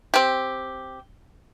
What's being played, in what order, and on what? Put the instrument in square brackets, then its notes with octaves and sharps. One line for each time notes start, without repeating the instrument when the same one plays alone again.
[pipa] C4 G4